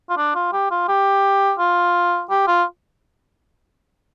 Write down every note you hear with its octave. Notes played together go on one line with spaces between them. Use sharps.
F4
D4
F4
G4
F4
G4
F4
G4
F4